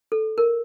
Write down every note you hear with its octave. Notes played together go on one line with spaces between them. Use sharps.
A4
A#4